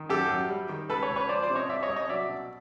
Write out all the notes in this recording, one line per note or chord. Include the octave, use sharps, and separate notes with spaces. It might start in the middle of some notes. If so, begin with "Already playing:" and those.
Already playing: D#3
F#2 G4 A4
F#2
G3
D#3
C#2 A4 B4
B4 C#5
C#2
B4 C#5
F3 C5 D5
C5 D5
C3
C#5 D#5
C2 D5 E5
C#5 D#5
C2
C#5 D#5
F#3 D5 E5
B2